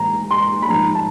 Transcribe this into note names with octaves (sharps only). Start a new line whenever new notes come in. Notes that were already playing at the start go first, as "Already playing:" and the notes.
Already playing: A2 E3 A#5
C6
B5
G#2 F3 G#3 A#5
A5